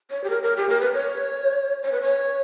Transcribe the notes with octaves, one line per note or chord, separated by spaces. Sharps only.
C#5
G4
A#4
A#4
G4
A#4
B4
C#5
C#5
B4
C#5